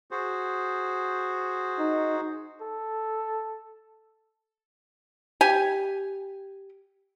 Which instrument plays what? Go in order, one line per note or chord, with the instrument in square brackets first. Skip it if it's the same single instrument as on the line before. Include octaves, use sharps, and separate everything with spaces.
[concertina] F#4 G#4 C5
[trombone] D#4
[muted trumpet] A4
[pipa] G4 G#5